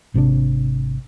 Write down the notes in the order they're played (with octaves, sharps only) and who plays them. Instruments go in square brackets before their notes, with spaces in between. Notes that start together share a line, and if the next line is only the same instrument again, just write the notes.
[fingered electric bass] G#1 C3 D#3 D4